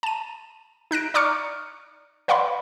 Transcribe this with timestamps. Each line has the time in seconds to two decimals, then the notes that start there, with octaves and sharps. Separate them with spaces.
0.03 A5 D#7
0.91 D#4 F#6 A#6 D7
1.14 D5 A#5 C#6 D6 F6 C#7
2.28 B4 D5 F5 F#5 B5 C6